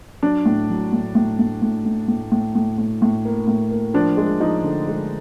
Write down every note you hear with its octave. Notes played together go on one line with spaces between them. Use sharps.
F#3 D4
A2
F#3
A2
A2
A2
A2
A2
A2
A2
A2
A2
A2
A#3
A2
A#3
F3 D4
G#3
F3 D#4
D3
G#3